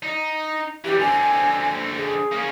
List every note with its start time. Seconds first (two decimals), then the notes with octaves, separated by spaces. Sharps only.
0.03 D#4
0.85 E3 G3 G4
1.00 D3 C4 G#5
1.98 G#4
2.32 A#3 C#4